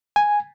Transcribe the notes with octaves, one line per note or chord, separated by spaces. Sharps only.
G#5